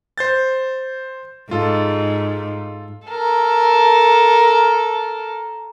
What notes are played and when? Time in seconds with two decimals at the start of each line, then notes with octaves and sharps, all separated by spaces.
0.18 C5 G6 A6
1.51 G#2 F4 A4
3.07 A4 A#4